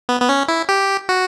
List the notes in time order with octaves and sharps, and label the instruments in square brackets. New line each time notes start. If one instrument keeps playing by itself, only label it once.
[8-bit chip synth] B3
B3
C#4
E4
G4
F#4